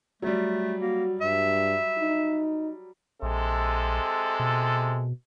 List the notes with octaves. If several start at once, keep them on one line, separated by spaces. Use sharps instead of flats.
F#3 G3 A3
A#3 F#4
G2 E5
D#4
A#1 C3 G#3 A4
B2